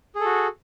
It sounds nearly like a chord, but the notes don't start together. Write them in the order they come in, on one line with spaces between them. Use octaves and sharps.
G#4 A4 F#4